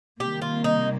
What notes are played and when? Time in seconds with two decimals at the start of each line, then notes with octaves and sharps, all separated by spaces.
0.20 C3 D#3 G3 A#3 G4
0.42 F4
0.64 D#4